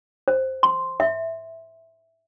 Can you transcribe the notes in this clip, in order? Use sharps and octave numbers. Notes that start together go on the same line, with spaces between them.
C5
C6
E5